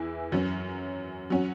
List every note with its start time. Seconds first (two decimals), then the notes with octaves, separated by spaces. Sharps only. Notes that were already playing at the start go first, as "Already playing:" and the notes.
Already playing: E2 E3 E4 G#4
0.32 F#2 F#3 C#4
1.30 F#3 C#4 F#4